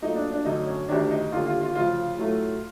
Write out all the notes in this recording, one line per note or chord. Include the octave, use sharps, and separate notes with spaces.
A#2 F#3 A3 D#4
D4
D4
F#2 D3 F#3 A3 D#4
C#4
D2 C3 D#3 D4
D#4
D#2 D3 G3 F4
F4
F4
D2 C#3 F3 F4
A2 F#3 A3